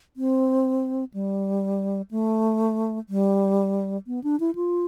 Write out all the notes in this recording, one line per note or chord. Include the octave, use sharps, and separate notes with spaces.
C4
G3
A3
G3
B3
D4
E4
F4